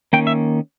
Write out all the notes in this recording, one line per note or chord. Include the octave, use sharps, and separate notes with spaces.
D#3 A#3 C#4 G5
E5